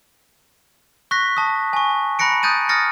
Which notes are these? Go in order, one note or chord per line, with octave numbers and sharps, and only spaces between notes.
C#6 F#6 A#6 B6
A5 D#6
G#5 C#6
A#5 B5 F#6 A#6 C#7 D7
D#6 F#6 G6 A6 D#7
D#6 F6 A6 A#6 C#7